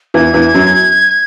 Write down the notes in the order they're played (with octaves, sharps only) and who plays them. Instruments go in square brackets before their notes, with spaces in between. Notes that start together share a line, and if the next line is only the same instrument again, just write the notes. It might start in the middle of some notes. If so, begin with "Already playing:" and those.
[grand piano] E2 E3 [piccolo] G#6
[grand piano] E2 E3
F#2 F#3